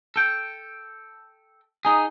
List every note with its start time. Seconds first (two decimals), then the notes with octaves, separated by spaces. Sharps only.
0.16 A4 G5
1.85 D#4 G#4 G#5 A#5